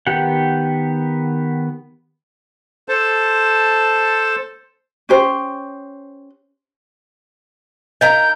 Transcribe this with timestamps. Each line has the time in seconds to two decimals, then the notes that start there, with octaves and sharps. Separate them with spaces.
0.07 D#3 B3 G4 F#5
2.88 A4 C5 A5
5.09 C#4 G4 C5
8.01 D#4 A#4 D#5 F5 A#5 G6